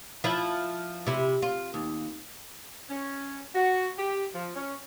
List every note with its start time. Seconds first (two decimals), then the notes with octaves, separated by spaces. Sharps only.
0.24 F3 E4
1.07 C3 E4
1.42 F4
1.74 D#2
2.89 C#4
3.54 F#4
3.98 G4
4.33 F3
4.56 C#4